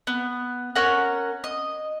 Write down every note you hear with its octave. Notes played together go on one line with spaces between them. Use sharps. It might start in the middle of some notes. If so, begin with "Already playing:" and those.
B3
C#4 A#4 F#5
D#5